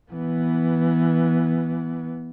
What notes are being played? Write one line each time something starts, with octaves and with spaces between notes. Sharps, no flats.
E3 B3